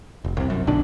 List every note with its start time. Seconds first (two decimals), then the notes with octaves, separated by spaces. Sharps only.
0.24 F1
0.37 C2 C3
0.50 F#2
0.67 A#1 B2 D3 D4